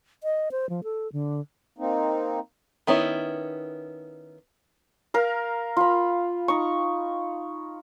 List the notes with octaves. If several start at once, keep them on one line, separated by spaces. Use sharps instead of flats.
D#5
C5
F3
A4
D3
A#3 C4 D#4
D#3 B3 C#4 E4
A#4 F5
F4 B5
D#4 C#6